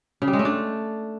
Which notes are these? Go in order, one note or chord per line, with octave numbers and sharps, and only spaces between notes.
C#3
G3
G#3
A3
D4